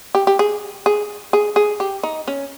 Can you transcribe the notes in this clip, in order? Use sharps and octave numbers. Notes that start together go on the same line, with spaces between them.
G4
G4
G#4
G#4
G#4
G#4
G4
D#4
C#4